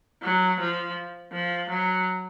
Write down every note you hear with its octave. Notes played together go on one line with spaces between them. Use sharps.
F#3
F3
F3
F#3